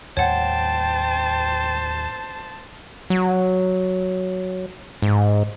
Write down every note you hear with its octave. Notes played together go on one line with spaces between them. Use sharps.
D#2 A2 G3 C5 C#5 F#5 G5 A5
F#3
G#2